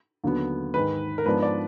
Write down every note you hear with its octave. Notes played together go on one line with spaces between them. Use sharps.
D#2 D3 F#3 B3
G#2 D#3 G#3 B4
A#4
G#2 F3 B3 D4 B4
D5